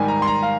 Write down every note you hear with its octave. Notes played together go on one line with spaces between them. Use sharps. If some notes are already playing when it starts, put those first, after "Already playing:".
Already playing: G#2 D#3 G3 G#5
A#5
C6
A#5
F5